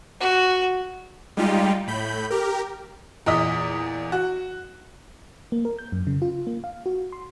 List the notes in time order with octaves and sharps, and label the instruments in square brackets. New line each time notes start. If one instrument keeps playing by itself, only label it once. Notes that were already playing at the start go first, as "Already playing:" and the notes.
[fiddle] F#4
[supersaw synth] G3 G#3 D#4 F4 G4
A2 B5 G6
G4 A#4
[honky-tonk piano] E2 A#2 D#5 D#6 B6
F#4
[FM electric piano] A#3
A#4
G6
F#2
C#3
F4
A#3
F5
F#4
C6